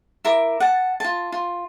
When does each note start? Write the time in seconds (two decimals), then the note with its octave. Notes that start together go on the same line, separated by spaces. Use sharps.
0.25 E4 A#4 D6
0.60 F#5 A5
1.00 F4 A5
1.32 F4